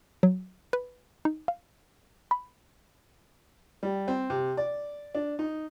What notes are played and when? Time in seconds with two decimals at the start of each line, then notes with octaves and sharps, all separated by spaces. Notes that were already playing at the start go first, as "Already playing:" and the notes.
0.23 F#3
0.73 B4
1.25 D#4
1.48 F5
2.31 B5
3.83 G3
4.08 C4
4.30 C3
4.57 D5
5.15 D4
5.39 D#4